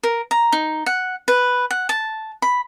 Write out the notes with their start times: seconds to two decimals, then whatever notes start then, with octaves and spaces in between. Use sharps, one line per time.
0.03 A#4
0.31 A#5
0.52 D#4
0.86 F#5
1.28 B4
1.71 F#5
1.89 A5
2.42 B5